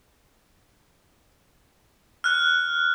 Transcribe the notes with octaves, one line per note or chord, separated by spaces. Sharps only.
F6 F#6